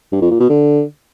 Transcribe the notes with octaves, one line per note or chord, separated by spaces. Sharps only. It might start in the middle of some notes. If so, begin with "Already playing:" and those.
G2
F2
A#2
B2
D3